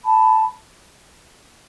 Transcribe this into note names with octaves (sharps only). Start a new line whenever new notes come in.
A5 B5